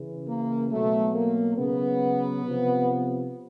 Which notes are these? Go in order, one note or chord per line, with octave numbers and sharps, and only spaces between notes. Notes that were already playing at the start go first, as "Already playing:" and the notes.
Already playing: C#3 E3
A#3
B2 F#3 A3
A#3
C#3 F#3 B3
C3 F3